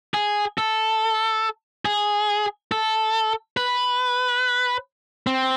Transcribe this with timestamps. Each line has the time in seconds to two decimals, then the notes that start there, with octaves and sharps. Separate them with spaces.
0.14 G#4
0.58 A4
1.85 G#4
2.72 A4
3.57 B4
5.27 C4